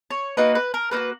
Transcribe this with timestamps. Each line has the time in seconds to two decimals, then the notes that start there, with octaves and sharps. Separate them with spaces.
0.10 C#5
0.37 A#3 D#4 F#4 B4
0.55 B4
0.74 A#4
0.91 A#3 D#4 B4
0.96 F#4